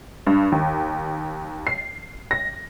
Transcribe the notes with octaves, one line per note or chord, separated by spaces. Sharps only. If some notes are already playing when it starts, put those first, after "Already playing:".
G2
D#2
C7
A#6